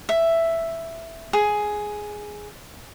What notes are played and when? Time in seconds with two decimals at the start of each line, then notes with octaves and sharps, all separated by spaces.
0.09 E5
1.33 G#4